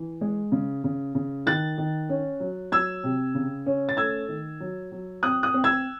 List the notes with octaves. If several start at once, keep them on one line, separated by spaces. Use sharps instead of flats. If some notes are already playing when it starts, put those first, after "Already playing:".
Already playing: E3
G#3
C#3
C#3
C#3
D#3 F#6 A6
D#3
C#4
F#3
F#3 E6 G#6
C3
C#3
C#4
A6
A3 E6 G#6
D#3
F#3
F#3
C4 D#6 F#6
D#6 F#6
C4
E6 G#6